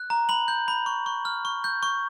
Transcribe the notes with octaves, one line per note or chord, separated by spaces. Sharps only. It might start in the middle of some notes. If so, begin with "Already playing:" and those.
Already playing: F#6
A#5
B5 F#7
G6
B5
C#6
C#6
F6
C#6
G6
C#6